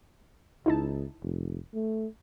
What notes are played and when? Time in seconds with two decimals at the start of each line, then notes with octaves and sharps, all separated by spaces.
0.66 C#2 D#4 E4 A5
1.23 F1
1.74 A3